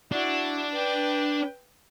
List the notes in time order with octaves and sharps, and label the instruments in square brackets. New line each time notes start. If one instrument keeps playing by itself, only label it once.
[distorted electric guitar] D4 [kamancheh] E4 F#4
[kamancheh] B4 G5